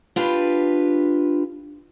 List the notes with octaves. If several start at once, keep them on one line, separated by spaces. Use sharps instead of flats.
D4 F4 G4 B4